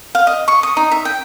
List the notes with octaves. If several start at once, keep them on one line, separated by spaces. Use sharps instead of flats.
F5
D#5
C#6
D#6
D#4
E5
G5